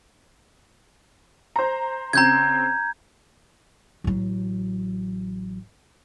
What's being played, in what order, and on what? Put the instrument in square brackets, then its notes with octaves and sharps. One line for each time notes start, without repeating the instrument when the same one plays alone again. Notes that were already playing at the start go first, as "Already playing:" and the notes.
[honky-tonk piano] C5 A#5
[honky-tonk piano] C#3 C4 [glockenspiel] A#5 G6 G#6
[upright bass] A1 F#3